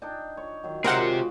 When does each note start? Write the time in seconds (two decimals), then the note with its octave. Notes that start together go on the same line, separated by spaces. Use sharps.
0.02 D4 D#4 G5
0.37 C#5
0.63 D#3 F#3
0.84 G#3 C4 F4 G4 A#4 C5 F#5
1.13 F#4